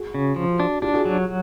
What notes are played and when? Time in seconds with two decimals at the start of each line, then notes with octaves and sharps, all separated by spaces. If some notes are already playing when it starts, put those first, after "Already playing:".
Already playing: F#4 G#4
0.15 C#3
0.36 F3
0.60 D4
0.82 D4 F4 G4
0.94 F#4 G#4
1.05 F#3